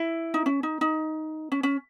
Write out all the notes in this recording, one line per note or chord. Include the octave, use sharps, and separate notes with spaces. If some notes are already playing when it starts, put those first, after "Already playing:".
Already playing: E4
D#4
C#4
D#4
D#4
C#4
C#4